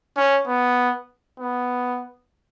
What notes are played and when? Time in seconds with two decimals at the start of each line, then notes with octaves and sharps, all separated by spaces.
0.16 C#4
0.47 B3
1.39 B3